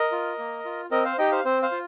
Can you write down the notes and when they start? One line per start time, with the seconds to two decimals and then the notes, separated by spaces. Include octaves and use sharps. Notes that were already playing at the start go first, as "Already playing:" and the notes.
Already playing: A#4 D#5
0.12 F4
0.38 A#3
0.65 F4
0.91 C4 A#4 D#5
1.04 C5 F5
1.18 D#4 G4 D#5 G5
1.32 C5 F5
1.45 C4 C5
1.63 C5 F5
1.71 F4